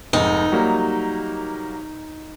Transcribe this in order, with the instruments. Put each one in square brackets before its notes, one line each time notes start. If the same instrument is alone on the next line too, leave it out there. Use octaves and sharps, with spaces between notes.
[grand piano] F1 G#2 [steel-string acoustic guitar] D#4
[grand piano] F#3 G3 A#3